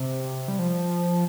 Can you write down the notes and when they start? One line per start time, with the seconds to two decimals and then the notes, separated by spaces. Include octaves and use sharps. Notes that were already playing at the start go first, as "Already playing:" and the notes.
Already playing: C3
0.48 G3
0.59 F3